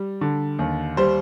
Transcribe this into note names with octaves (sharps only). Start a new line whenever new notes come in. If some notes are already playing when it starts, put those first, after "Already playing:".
Already playing: G3
D3
D#2
G3 C5